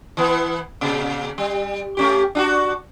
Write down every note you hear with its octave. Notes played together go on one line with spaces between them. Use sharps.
E3 B3
A#2 C#3
G3
A3 C#4 G4
D4 F4 F#4